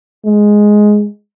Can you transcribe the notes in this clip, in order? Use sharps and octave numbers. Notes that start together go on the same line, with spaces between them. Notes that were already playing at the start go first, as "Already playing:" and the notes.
G#3